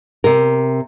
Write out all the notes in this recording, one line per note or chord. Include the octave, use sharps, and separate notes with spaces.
C3 A#4